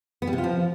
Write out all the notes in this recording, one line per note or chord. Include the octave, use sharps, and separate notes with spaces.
B3
G3
C3
F4
F3